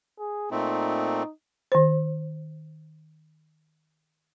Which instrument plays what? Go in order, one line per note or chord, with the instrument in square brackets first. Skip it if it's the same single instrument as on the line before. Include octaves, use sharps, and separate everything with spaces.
[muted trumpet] G#4
[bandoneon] A#2 A3 C4 [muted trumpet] D#4
[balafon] D#3 C5